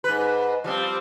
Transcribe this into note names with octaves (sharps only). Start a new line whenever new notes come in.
G#2 B4
F3 G3 C4